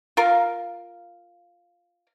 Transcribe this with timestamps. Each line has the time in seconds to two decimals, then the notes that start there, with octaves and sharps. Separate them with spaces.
0.17 F4 A#4 F5